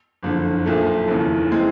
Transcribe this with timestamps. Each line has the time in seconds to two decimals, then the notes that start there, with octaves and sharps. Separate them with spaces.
0.23 F#1 F2 D3
0.65 B1 A#2 F3 A3
1.08 F1 D#2 C#3 E3
1.51 E3 G#3 C4